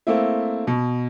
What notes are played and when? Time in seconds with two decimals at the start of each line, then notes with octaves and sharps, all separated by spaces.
0.07 A3 A#3 C4 E4
0.67 B2